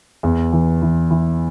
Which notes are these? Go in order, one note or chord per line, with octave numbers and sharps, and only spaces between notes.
E2
E3
E3
E3